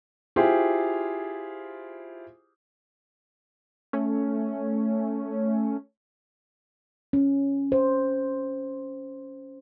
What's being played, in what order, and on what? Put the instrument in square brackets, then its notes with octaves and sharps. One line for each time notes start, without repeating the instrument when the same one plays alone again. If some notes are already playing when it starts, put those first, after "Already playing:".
[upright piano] E4 F4 G4 G#4 C5
[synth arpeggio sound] A3 C#4
[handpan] C#4
C5